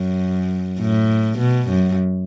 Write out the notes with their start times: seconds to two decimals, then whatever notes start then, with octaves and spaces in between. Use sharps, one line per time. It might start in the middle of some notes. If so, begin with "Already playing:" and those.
Already playing: F#2
0.80 A2
1.39 B2
1.69 F#2